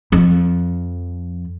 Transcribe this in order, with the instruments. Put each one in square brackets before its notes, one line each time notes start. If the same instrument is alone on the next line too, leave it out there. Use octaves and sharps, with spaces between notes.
[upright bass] F2